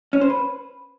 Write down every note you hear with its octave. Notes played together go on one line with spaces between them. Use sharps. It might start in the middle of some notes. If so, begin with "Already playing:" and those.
C#4
C5
B4